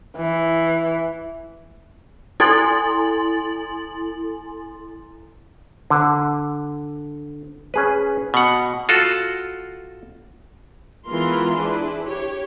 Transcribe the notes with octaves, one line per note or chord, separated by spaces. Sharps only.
E3
E4 A4 G#5 C6 A6 F#7
D3
C#4 G#4 B4
B2 F#5
F4 F#4 A4
E3 G#3 B3 F4 A#4 C6
D4 E4 G#4 B4
G4 C#5